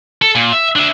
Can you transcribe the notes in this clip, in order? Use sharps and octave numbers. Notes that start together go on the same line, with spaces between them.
A4
A#2
E5
D4 E5